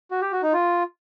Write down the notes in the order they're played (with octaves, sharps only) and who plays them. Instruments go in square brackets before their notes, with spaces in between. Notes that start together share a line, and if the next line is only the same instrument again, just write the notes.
[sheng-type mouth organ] F#4
G4
F#4
D#4
F4